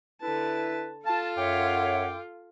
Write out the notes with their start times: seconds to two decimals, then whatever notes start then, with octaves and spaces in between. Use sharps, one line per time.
0.22 D3 E4 B4 A5
1.05 F4 A4 A5
1.37 F#2 C#5 E5 F#5 G5 D6